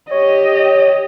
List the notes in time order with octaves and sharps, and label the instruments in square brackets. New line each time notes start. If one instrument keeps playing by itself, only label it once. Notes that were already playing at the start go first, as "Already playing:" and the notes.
[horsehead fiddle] G4 D#5 [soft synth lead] C#5